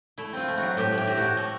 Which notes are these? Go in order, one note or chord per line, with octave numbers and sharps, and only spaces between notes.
A3 E4
C4 F4
A3
F#3 F#4
A2 G4
A3
G4
A2
A2 F#4
A3